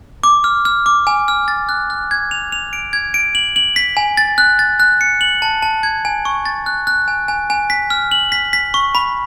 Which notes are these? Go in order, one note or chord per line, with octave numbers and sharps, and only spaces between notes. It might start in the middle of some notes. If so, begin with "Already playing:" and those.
D6
F6
F6
D6
G#5
F6
A6
F#6
F#6
G#6
F7
F7
D7
G#6
D7
F#7
F#7
B6
G#5
A6
F#6
A6
F#6
C#7
F#7
A5
A5
G#6
G#5
C#6
A6
F#6
F#6
G#5
G#5
G#5
B6
F6
F#7
B6
B6
C#6
B5